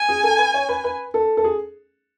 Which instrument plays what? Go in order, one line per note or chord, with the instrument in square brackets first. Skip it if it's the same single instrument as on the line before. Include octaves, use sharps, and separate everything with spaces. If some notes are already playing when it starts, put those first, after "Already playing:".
Already playing: [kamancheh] G#5
[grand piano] G#4
A4
B4
C#5
B4
B4
A4
A4
G#4